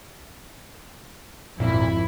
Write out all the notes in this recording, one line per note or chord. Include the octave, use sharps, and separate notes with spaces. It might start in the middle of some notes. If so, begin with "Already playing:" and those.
G#1 F2 A#2 E4